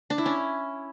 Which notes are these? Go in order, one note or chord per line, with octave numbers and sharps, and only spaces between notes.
D4
E4
C#4